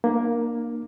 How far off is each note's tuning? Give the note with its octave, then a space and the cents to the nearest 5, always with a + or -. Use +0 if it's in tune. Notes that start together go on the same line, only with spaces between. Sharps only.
A#3 +10 D4 +35